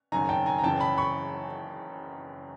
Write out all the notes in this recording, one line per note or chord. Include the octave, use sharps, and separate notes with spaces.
F#1 F#2 D#3 G#5 A#5
G5 A5
G#5 A#5
A#5
F#1 F#2 C#3 E3 G5 A5
A5 B5
B5 C#6